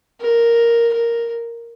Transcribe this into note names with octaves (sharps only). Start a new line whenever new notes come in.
A#4
A#4